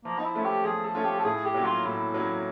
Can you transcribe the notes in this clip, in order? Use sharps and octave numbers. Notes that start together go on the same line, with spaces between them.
F3 A#3
D#4
E4
A3 C#4 F4
G4
F3 G#4
A4
A3 C#4 F4
G4
A4
A2 G#4
G4
F#3 A#3 C#4
F4
A2 E4
F#3 A#3 C#4